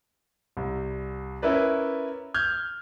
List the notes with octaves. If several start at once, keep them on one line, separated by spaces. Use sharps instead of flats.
C2
C#4 E4 A#4 B4 D5
F6 G6 G#6